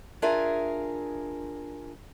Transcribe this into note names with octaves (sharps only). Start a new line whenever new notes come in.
D4 F4 G#4 A#4 E5 G#5